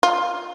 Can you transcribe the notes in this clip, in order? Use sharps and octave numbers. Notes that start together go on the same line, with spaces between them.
F4